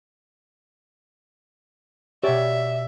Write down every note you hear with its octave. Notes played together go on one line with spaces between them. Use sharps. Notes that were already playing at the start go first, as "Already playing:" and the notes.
B2 G4 C#5 D5 E5